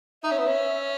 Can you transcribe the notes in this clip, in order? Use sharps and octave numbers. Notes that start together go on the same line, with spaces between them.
D#4 E5
C#4
B3
C#4